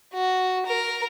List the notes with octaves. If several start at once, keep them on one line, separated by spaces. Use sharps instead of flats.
F#4
A#4